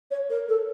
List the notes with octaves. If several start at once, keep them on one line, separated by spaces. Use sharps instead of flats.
C#5
A#4
A4